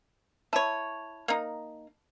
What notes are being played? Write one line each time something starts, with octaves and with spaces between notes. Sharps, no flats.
E4 C#5 A5 B5
A#3 D#4